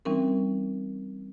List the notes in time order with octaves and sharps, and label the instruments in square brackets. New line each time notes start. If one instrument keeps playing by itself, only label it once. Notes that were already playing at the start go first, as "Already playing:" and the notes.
[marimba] E3 G3 C4 C#4 D#4 A#4